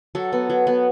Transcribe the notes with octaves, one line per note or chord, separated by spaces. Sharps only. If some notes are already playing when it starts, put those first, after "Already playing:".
F#3 A4
B3
F#3
B3